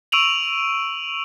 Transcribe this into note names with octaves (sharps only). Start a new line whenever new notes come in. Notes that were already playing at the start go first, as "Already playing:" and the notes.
C#6 E6 D7 D#7 F7 F#7